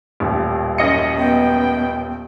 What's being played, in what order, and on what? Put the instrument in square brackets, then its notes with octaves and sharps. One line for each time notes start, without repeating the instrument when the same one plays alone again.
[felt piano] D#1 A1
[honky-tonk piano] F#2 D#5 C#7
[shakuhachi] B3 [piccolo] G5